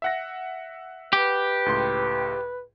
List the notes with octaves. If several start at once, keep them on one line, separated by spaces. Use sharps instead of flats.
E5 F#5 A#6
G4 B4
C#2 A2 C6